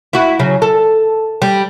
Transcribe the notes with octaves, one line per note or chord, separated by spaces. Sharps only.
E4 F#4
C#3 F#3
A4
G3